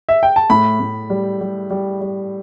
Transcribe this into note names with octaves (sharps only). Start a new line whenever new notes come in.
E5
G5
A5
A2 B5
A2
G3
G3
G3
G3